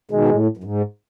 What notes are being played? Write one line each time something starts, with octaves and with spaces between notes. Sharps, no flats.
B2 D#3 G#3
A2
F#2
G#2